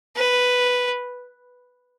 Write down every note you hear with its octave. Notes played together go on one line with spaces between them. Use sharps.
B4